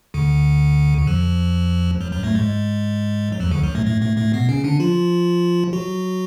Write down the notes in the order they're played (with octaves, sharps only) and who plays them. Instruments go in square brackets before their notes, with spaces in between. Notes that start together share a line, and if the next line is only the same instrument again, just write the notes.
[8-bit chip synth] D2 D3
D3
F2 F3
F#2 F#3
F#2 F#3
A2 A3
G#2 G#3
F#3
F2 F3
D2 D3
F#2 F#3
A2 A3
A2 A3
A2 A3
A2 A3
B2 B3
C#3 C#4
D3 D4
F3 F4
F#3 F#4